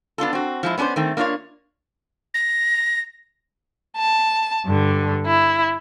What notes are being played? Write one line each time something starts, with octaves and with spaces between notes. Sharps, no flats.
B3 D4 F4 A4
C4 F#4
F3 G#3 E4
B3 C#4 D4 G4 C5
D#3 A3 C4
A#3 D4 F4 A#4 C#5
A#6
A5
G2 D3
E4